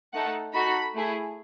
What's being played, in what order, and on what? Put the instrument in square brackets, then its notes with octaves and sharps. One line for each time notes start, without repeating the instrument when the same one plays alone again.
[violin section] A3 D#4 A4 F#5
D#4 F#4 A4 B5
A3 E4 G#4